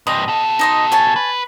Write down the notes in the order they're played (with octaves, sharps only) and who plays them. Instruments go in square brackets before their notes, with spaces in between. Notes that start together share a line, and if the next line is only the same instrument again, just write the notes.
[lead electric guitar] G2 C3 [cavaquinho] D#5
[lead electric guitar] B2 A4
[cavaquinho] D#4 D#5 C6
C#5 G#5 A5
[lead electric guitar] B4